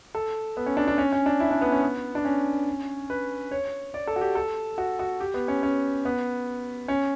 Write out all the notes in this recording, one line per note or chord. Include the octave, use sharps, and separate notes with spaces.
A4
B3
C#4
D4
D4
C#4
C#4
D4
E4
D4
B3
C#4
B3
D4
C#4
B4
C#5
D5
A4
F#4
G4
A4
F#4
F#4
G4
B3
C#4
C#4
B3
C#4